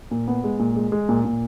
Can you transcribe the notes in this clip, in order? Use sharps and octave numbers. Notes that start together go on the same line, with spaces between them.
A#2
B3
G#3
A#2
G#3
G#3
A#2
A#2